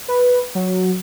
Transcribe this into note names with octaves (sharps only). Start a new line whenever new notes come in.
B4
F#3